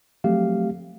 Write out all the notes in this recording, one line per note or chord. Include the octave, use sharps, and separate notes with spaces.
F3 F#3 A3 C4 G4 F5